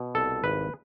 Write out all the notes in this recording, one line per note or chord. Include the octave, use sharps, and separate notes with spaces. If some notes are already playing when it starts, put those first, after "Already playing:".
Already playing: B2
C2 A4
G#1 B4